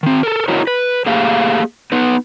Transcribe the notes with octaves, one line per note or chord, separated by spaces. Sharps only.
D#3 C4
A4 A#4
E4 F#4 A#4 C#5 D#5
B4
A3 A#3 G4 G#4 F5
B3 D#4 B4